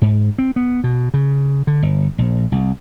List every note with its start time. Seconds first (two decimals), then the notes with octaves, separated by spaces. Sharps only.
0.02 G#2
0.38 C4
0.56 B3
0.84 B2
1.14 C#3
1.67 D3
1.83 G1
2.18 A#1
2.52 C2